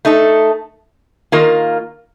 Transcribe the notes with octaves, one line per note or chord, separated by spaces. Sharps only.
A3 D#4 A4
D#3 A#3 F4 A#4